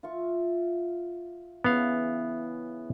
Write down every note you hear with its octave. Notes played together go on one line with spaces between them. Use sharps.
F4 E5 C#6
C#3 E3 B3 F5